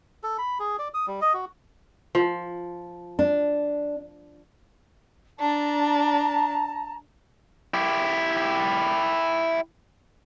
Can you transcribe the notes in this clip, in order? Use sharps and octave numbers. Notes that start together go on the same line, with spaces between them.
A4
B5
G#4
D5
D#6
G3
D#5
F#4
F3
D4
D4 A5 A#5
E4 G4